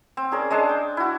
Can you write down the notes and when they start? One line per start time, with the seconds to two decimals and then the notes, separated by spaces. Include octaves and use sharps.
0.17 C4
0.32 C#4 G#4 A#4 D5
0.51 G#3 D4 G#4 A5
0.69 G5
0.97 E4 F#4